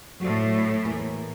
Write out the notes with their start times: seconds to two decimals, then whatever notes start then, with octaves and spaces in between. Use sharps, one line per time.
0.20 A2 F#3 A3 F#4 D5
0.85 E2 A#3 G#4